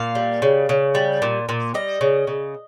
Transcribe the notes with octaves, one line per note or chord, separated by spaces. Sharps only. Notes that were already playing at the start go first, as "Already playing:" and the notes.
Already playing: A#2 F5
G3
C#3
C#3
G3
A#2
A#2
G3 D#5
C#3
C#3